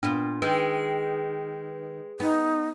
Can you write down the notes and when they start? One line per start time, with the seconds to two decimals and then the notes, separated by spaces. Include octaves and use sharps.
0.03 A#2 B3 D4 F4
0.42 D#3 G#3 B4
2.20 B3 D#4